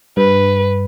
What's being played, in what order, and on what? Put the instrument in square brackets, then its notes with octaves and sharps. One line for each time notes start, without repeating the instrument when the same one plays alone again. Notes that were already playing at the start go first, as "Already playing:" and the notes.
[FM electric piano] G2 [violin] B4